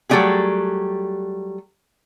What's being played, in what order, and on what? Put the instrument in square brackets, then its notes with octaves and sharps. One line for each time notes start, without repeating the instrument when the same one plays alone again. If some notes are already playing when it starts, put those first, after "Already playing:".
[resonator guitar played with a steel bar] F#3 G3 A3 D#4 G4 G#4